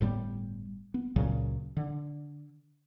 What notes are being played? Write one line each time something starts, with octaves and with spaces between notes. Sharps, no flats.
G1 A2 G3 B3
B3
C#2 A#2 C#3 F#3
D3